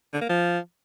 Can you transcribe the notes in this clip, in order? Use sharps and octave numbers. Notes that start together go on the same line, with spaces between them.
D3
A#3
F3